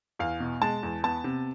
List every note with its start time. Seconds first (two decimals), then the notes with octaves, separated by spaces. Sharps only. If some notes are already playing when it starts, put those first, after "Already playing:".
0.19 E2 F5
0.40 B2
0.62 G#3 A5
0.83 E2
1.04 B3 A5
1.24 C3